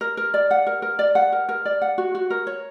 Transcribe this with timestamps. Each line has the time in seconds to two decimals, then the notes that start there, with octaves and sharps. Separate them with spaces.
0.01 A#4
0.17 A#4
0.34 D5
0.51 F#5
0.67 A#4
0.82 A#4
0.99 D5
1.15 F#5
1.32 A#4
1.49 A#4
1.65 D5
1.82 F#5
1.98 F#4
2.15 F#4
2.30 A#4
2.47 C#5